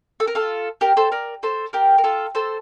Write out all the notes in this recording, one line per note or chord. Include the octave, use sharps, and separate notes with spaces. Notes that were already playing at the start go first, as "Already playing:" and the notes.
A4
A#4
F4 A4
G4 A#4
A4 C5
A#4 D5
A4 C5
G4 A#4
A#4
F4 A4
A4 C5